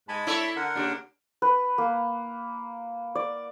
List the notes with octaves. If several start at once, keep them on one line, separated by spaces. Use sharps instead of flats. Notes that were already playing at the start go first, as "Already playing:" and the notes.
G#2 G#3 A5 B5
A3 E4 A4 C#5 D5 E5
D3 A#4 F#5
D#2 C#3 D4
B4
A#3
D5